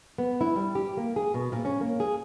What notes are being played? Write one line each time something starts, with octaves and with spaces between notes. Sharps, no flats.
B3
E4
G3
G4
A#3
G#4
B2
A#2
C#4
A#3
G#4